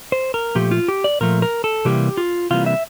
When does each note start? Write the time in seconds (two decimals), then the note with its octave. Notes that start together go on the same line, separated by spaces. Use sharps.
0.12 C5
0.34 A#4
0.55 A#2 F3 A3 G4
0.71 F4
0.88 G4
1.04 D5
1.21 A#2 F3 A3 A#4
1.42 A#4
1.64 A4
1.85 C3 E3 G3 A#3 G4
2.17 F4
2.50 C3 E3 G3 A#3 F4
2.66 E5